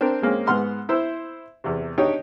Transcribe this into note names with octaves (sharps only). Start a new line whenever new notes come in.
C4 D4 A#4
G#3 A#3 C4 C#4
G#2 B3 F#5 C6 F6
E4 C5 E6
E2 C3
D4 D#4 G4 C#5